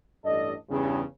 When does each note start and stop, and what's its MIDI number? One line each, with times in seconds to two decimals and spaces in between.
0.25 0.53 33
0.25 0.53 43
0.25 0.53 69
0.25 0.53 74
0.25 0.53 75
0.70 1.02 40
0.70 1.02 43
0.70 1.02 49